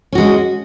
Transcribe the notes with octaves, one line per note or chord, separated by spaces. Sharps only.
G#3 C#4 F#4